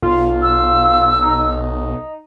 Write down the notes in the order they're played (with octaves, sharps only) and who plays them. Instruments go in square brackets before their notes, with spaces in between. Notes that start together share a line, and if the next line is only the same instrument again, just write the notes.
[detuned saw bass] B1 [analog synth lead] F4
[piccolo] E6
[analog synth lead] D#4